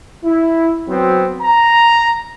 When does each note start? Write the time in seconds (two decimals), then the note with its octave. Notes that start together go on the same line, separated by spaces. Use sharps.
0.24 E4
0.89 F#3 B3 C4
1.42 A#5